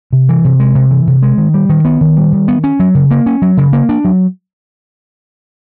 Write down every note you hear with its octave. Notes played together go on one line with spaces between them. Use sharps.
C3
E3
C3
G#3
C3
E3
C3
G#3
D#3
G3
D#3
B3
D#3
G3
D#3
B3
C#4
F#3
C#3
A#3
C#4
F#3
C#3
A#3
D4
F#3